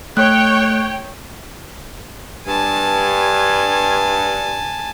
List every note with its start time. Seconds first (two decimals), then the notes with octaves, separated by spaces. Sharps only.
0.17 A3 C#5 G5 F#6
2.46 G2 G#5 A5